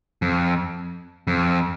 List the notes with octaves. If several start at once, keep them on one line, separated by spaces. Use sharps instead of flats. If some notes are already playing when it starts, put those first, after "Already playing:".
F2
F2